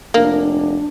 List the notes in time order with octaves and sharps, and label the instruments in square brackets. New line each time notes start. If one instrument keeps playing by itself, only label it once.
[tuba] F1 [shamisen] A#3 [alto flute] D4